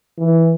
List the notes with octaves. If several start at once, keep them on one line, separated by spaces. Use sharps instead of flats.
E3